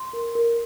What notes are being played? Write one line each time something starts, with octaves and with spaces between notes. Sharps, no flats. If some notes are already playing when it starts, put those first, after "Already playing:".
Already playing: C6
A#4
A#4